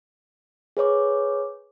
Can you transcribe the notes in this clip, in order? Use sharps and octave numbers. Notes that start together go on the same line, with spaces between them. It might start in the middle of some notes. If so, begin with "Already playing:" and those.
G#4 B4 C#5 D6